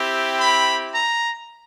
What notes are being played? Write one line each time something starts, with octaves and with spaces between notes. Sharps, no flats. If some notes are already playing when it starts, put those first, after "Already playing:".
Already playing: C4 E4 G4
B5
A#5